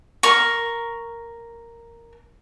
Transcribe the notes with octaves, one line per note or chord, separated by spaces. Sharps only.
A#4 C#6